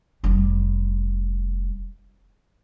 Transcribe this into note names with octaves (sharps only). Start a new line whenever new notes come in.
F1 G3